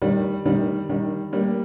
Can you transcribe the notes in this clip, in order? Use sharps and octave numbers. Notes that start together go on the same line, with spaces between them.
D#3 G3
D#3 G3
D#3 G3
G3 A#3